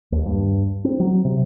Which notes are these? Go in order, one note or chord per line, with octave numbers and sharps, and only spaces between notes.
D#2
G2
C4
F#3
C3